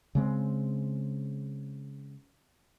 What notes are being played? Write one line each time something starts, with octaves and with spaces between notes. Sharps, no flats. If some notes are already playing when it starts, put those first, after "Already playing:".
C#3 G#3 C4